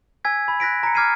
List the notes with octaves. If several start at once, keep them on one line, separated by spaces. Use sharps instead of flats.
G#5 E6 G#6 B6
B5
F#6 A#6 B6 D7
A#5 C#7
D6 F6 G#6 B6 C7 D#7